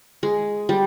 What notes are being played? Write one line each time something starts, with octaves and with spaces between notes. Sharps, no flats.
G#3
G3